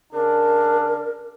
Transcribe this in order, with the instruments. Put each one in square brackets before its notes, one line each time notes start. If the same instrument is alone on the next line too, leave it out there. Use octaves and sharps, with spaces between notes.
[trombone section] C#3 D4 [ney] A#4